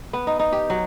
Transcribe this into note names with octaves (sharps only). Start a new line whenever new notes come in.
B3
D#4
D#4
G4
F#3